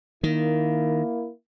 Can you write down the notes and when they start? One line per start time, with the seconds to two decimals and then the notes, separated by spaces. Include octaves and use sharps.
0.23 D#3 A#3 E4